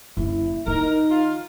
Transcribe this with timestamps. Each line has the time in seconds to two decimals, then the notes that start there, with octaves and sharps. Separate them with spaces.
0.17 F#1 D3 E4
0.67 D#3 D#4 A#4
1.11 F4